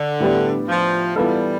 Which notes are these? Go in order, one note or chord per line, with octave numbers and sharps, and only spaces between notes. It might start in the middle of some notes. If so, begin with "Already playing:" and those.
Already playing: D3
A2 G3 B3 D4 G4
F3
E3 G3 B3 F4 A4